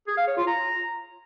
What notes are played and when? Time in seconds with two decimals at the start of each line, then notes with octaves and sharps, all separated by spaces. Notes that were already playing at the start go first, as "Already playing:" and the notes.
0.07 G#4
0.17 F5
0.27 C#5
0.37 F4
0.47 A#5